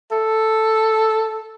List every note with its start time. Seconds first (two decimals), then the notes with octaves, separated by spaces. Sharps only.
0.11 A4